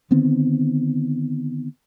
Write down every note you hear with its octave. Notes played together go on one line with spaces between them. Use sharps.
D3 D#3 B3 C4